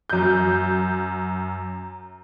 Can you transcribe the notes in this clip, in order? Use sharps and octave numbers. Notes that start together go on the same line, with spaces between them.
F#2 G6